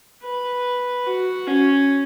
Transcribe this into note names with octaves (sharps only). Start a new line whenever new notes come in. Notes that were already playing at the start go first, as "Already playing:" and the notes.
B4
F#4
C#4